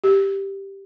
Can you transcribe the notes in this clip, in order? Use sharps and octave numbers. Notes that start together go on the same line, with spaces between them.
G4